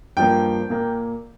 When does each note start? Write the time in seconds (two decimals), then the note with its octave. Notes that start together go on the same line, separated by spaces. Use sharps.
0.17 G2 F3 A#3 G5
0.70 A#2 A#3